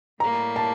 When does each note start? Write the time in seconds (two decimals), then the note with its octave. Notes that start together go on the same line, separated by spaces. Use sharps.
0.20 A2 G3 A#3 A#5
0.56 A5